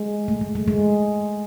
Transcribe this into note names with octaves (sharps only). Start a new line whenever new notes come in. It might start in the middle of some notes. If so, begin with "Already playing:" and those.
Already playing: G#3
A3
G#3
G#3
G#3